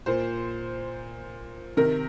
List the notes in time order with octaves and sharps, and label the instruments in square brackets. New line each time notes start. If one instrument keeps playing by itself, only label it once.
[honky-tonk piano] A#2 C5
C3 D#3 A#4